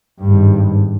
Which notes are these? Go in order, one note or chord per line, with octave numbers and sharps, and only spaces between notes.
G#1 G2